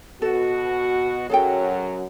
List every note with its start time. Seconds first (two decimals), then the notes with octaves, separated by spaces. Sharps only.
0.22 B2 F#4 A4
1.29 F#2 F#3 G#4 A4 G5